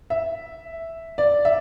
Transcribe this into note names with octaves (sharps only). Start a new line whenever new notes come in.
E5
D5
E5